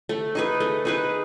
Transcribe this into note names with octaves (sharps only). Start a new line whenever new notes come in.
A3
D#4 G#4 B4
A3
D#4 G#4 B4